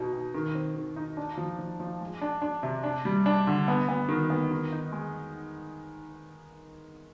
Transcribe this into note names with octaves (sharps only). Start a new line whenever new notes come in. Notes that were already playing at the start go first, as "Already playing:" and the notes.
Already playing: B2 D#4
B2
D#3
C4
D#3
D#4
D4
F3
F3
F3
G#3
D4
D4
C3
D4
G3
D4
D3
B3
B3
D#3
B3
D#3
D#4
G#3